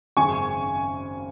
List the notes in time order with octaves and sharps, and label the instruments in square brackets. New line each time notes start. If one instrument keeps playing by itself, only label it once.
[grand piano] G#1 F#2 C#3 G#5 C#6